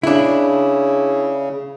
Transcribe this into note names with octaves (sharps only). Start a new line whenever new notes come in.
C#3 D4 E4